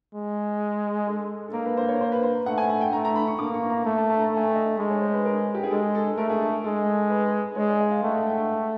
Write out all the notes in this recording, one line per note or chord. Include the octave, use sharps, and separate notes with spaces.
G#3
A4
A4
A#3 A#4
B4
C5
C#5
C5
B4
C5
A3 F#5
G#5
F#5
G5
A3 A#5
A#5
B5
C#6
A#3 D6
C#6
A#5
A3
A5
A5
A#5
A3
G#5
G5
D#5
G#3 D#5
C#5
C5
B4
A#4
G4
G#4
G#3 A4
A4
A3 A#4
G#4
A4
G#3 A4
B4
G#3 C#5
D5
D#5
F5
A3 G5
F#5
G5
G5